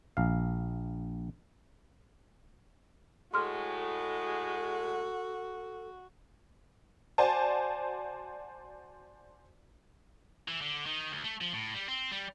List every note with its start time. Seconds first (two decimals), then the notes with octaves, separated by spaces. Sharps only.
0.17 A#1 F5
3.34 A2 G#3 F#4 A4 C6 F6
7.18 F#4 C5 D5 G#5 A5
10.48 E3
10.61 D3
10.86 D#3
11.11 D2
11.24 A3
11.41 F3
11.53 A2
11.74 G3
11.88 C4
12.12 G3